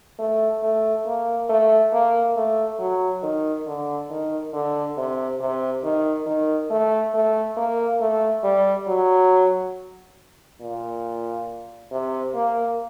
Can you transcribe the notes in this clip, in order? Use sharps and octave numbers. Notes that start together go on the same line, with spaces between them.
A3
A3
A#3
A3
A#3
A3
F#3
D#3
D3
D#3
D3
C3
C3
D#3
D#3
A3
A3
A#3
A3
G3
F#3
A#2
C3
A#3